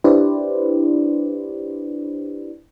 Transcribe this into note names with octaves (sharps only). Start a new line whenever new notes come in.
D4 E4 G4 B4 C5 D5